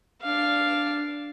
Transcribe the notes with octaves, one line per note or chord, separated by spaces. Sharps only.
D4 F5